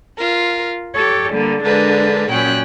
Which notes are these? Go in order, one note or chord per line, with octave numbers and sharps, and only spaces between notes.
F4 A#4
G4 A4 C#5
D3 G3 A#3
D3 G#3 D4 A#4 B4
F#2 A#2 C#4 G5 F#6